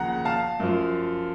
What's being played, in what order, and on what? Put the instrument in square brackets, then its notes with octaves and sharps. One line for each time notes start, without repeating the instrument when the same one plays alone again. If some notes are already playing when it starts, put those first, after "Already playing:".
Already playing: [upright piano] D#2 C#3 F3 F#5 A#5
F5 A5
F#2 F3